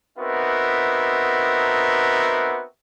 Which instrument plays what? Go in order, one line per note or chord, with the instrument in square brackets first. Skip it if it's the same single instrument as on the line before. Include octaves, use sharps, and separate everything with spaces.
[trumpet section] B3 C4 D#4 F#4 A#4 E5